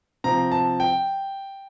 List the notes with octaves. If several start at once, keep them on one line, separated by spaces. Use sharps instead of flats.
C3 F3 C4 A#5
A5
G5